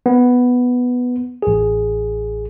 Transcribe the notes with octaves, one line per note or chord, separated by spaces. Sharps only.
B3
A1 G#4